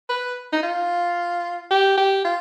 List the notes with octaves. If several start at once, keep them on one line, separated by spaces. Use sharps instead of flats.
B4
D#4
F4
G4
G4
F4